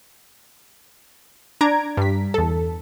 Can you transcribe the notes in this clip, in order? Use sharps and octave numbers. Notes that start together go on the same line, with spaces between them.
D4 A#5 G#6 D7
G2 B6
E2 A4